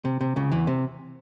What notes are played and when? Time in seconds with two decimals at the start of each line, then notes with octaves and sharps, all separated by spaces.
0.05 C3
0.21 C3
0.36 C#2 C#3
0.52 E2 E3
0.67 C3